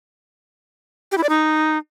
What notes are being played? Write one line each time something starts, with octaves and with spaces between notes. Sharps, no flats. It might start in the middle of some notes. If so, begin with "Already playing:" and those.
G4
E4
D5
D#4